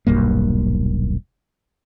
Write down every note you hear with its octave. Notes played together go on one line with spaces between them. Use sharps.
D#1 B1 G2 A#3